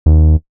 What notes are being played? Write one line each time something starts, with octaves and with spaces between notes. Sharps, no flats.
D#2